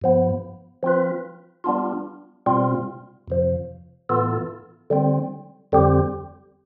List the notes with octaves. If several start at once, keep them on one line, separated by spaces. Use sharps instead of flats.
G2 F3 B3
F3 C4 F4 B4
G3 B3 D4 F4
B2 G3 C4 F4
F2 C3 F3
A2 E3 B3 F4 A4
D3 G3 C4
F2 D3 G3 C4 G4